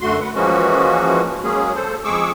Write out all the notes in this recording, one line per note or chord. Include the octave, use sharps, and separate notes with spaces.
F#2 D3 A3 F#4 C6
B4 F#5
E3 F3 G#3 A#3 C#4 F#4
F#3 G#3 A#3 C#4 G#4
A4 C5
F2 G#3 G#4 C#6 D6 E6